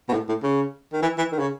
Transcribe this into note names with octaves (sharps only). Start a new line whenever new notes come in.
B2
A2
A2
C#3
D#3
E3
E3
D#3
C#3